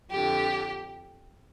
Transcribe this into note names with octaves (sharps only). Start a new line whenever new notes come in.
F2 D3 G4